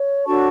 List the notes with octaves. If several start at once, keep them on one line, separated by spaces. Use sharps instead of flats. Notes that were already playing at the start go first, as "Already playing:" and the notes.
Already playing: C#5
D4 F#4 A4 C#5 A5 C#6